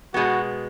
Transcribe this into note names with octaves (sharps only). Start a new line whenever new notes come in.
B2 G#3 B3 F#4